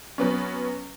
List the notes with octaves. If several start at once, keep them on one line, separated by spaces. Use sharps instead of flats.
F#3 B3 C#4